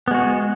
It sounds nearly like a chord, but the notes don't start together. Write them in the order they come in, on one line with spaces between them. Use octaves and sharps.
B3 G#3 F#4